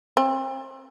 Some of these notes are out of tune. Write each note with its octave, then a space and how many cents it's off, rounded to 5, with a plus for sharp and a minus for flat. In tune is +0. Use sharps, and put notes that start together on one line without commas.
C4 +35